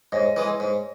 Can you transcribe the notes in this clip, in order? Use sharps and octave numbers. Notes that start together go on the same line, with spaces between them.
G#2 C#5 D#5
E3 G#3
G#2